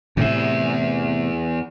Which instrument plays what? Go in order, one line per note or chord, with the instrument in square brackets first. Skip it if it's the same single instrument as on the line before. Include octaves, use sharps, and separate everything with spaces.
[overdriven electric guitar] E2 E5 [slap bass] A2 C3